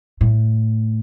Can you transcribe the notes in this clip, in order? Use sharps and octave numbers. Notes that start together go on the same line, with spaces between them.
A2